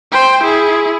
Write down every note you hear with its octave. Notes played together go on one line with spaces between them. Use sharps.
C5 G5
E4 G#4